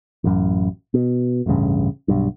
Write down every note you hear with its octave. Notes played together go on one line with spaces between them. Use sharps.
A1 F#2
B2
D1 A1 G2 C#3
B1 G2